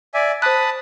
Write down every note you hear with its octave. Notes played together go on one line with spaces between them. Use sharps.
D5 E5 G#5
C5 A5 B5 D#6 F#6